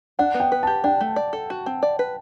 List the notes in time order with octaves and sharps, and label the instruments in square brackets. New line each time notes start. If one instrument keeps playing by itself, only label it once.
[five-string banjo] D4 [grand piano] F#5
[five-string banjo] B3
[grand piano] G5
[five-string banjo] B4
[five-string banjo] G4 [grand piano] A5
[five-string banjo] D4 [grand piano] G5
[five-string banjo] A3
D5
A4
F#4
C4
D5
B4